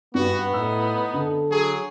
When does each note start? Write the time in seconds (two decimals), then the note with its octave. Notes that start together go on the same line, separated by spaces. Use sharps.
0.15 G2 B3 F#4
0.54 A2 D#4 E6
1.13 D3 A4
1.51 F#3 G#4